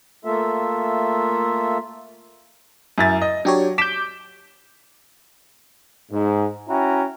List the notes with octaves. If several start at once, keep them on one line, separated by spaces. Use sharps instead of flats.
A3 A#3 F4 A4 E5
F#2 E4 A6
D#5
F#3 D4 G4 C#5
D6 G6 B6 E7
G#2
C#4 E4 F#4 G5 A#5